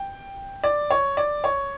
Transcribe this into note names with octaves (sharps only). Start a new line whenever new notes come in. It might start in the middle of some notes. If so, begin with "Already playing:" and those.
Already playing: G5
D5
C#5
D5
C#5